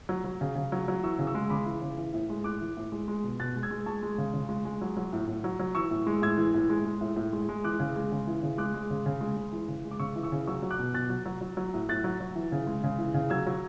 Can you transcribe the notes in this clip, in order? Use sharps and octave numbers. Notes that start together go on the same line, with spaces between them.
F#3
F#3
C#3
C#3
F#3
F#3
E3 C#6 E6
C#3
C#6 E6
G#3
C#3 B5 D6
E3
C#3
E3
A2
G#3
A2 D6 F#6
E3
A2
G#3
G#3
B2
B2 F#6 A6
G#3
E6 G#6
G#3
G#3 A5 C#6
G#3
C#3
C#3
G#3
G#3
F#3
F#3
A2
A2
F#3
F#3
E3 C#6 E6
A2
G#3
A2 E6 G#6
E3
A2
G#3
G#3
A2
A2
G#3
G#3
E3 D6 F#6
C#3
G#3
C#3
E3
C#3
G#3 D6 F#6
G#3
C#3
C#3
G#3
G#3
E3
C#3
G#3
D6
C#3 C#6 E6
E3
C#6 E6
C#3
F#3 C#6 E6
F#3
D6 F#6
B2
B2 F#6 A6
F#3
F#3
F#3
F#3
A2
A2 F#6 A6
F#3
F#3
E3
C#3
G#3
C#3
E3
C#3
F#3 E6 G#6
F#3